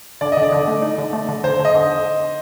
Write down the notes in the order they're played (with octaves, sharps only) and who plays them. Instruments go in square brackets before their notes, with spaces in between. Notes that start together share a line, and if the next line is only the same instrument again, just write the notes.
[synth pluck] D3 [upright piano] D5
[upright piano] D#5
[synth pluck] D3
[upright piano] D5
[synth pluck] D3
A3
D#4
D3
A3
D3
[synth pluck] D3 [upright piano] C5
[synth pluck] D3
[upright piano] D#5
[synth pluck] D3